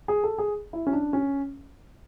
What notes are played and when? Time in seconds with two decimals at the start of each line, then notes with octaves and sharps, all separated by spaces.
0.08 G#4
0.24 A4
0.38 G#4
0.73 E4
0.87 C#4
0.93 D4
1.13 C#4